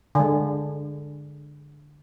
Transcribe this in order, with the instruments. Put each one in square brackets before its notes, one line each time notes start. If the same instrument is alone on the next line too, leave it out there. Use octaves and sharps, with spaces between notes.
[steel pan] D3 G#3